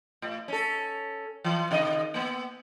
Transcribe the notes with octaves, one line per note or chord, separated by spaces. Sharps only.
A2
C#4 A4
E3
C3 D#3 D#5
A#3 B3